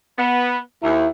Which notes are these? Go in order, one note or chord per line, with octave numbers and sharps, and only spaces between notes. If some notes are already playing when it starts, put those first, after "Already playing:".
B3
D#2 E4